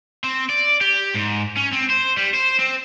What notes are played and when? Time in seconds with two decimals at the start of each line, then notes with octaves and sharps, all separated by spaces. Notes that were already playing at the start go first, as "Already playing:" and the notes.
0.24 C4
0.50 D5
0.81 G4
1.14 G#2
1.57 C#4
1.73 C4
1.90 C5
2.17 G3
2.34 C5
2.59 C4